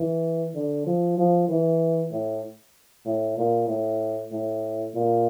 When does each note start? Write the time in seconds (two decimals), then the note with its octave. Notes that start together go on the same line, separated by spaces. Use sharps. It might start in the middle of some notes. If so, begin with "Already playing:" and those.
Already playing: E3
0.55 D3
0.86 F3
1.18 F3
1.49 E3
2.12 A2
3.05 A2
3.37 A#2
3.68 A2
4.32 A2
4.95 A#2